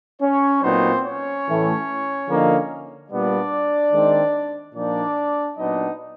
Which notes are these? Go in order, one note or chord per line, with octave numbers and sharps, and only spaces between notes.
C#4 C#5
A#2 F#3 B3 C4 D#4 C5
C#4 C#5
A2 E3 A3
D3 F3 A#3 D#4
A#2 G3 B3 D4 D5
D#3 G#3 C4 D#4
A#2 F3 A#3 D4 D#4 D5
A#2 F#3 B3 D4 D#4 D#5